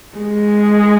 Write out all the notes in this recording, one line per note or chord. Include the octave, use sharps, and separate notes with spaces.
G#3